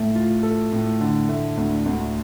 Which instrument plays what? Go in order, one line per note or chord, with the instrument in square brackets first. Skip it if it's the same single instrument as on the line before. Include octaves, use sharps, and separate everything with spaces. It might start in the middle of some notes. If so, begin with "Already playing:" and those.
Already playing: [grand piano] A2 A3
F4
A4
A2
D3
A3
D2
D2